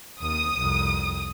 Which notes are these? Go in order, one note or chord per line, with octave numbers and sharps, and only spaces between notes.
D#2 D#6
C2 F2